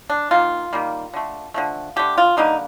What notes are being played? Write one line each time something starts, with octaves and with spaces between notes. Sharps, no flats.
D4
D#3 A#3 F4
D#3 G3 A#3
D3 A3
D3 F3 A3
D3 A3 G4
F4
D3 G3 A#3 D#4